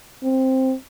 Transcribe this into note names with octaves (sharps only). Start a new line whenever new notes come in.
C4